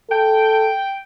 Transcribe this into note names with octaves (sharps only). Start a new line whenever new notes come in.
A4 G5